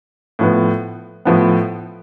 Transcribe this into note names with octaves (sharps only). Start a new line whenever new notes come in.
A2 F3 B3
A2 F3 B3